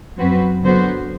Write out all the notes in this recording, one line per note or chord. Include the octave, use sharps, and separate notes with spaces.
F#2 F#3 C4 F#4 B4
D3 F#3 B3 F#4 C5